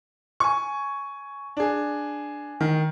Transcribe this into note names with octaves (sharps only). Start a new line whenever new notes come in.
G#5 C#6
D4 G#4
D#3